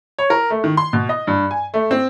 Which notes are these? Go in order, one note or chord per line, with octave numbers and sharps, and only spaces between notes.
C#5
A#4
A3
D#3
C6
B2
D#5
G2
G#5
A3
C4